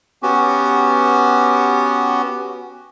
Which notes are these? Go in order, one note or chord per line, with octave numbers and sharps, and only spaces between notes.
B3 C#4 F#4 G4